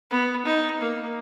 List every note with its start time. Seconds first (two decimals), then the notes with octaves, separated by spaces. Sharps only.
0.11 B3
0.45 D#4
0.81 A#3